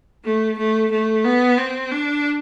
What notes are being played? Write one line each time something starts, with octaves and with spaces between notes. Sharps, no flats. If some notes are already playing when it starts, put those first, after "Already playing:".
A3
A3
A3
B3
C4
D4